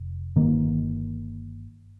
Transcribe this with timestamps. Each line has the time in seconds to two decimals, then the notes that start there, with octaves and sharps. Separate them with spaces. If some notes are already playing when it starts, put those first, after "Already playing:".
Already playing: F1
0.36 G1 G2 D#3 A#3